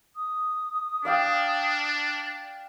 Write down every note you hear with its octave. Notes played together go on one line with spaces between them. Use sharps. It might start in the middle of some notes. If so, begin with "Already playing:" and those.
D#6
D4 D5 F5 G5